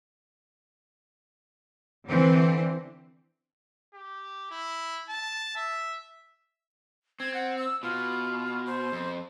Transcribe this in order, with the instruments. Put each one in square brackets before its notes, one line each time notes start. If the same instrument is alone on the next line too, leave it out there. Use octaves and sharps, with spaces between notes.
[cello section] D3 E3 C4
[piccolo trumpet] G4
E4
A5
E5
[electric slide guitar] C4 [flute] G#6
[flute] F#5
E6
[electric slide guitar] B2 [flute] F4
[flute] C5
[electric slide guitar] F2